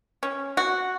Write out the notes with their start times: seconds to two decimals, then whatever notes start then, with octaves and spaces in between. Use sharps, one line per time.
0.23 C#4
0.57 F#4